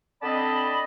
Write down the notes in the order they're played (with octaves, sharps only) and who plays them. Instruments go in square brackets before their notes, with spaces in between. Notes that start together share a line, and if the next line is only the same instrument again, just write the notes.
[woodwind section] D3 C4 D5 D#5 A5 B5